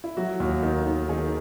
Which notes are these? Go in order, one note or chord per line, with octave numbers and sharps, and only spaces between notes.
E4
F#3 F#4
D#2
D#3
D#3
D#3 G#4